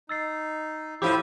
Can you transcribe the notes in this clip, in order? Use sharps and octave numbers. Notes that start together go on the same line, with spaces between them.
D#4 E6 A6 C7
A2 F3 E4 G4 D6 D#7